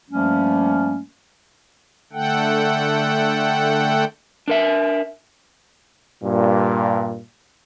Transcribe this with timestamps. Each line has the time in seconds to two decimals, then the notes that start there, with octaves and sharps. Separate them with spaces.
0.10 G2 F3 G3 A3 A#3 C#4
2.13 D3 A3 A4 F#5 G5
4.48 D4 A#4 E5
6.23 G2 A#2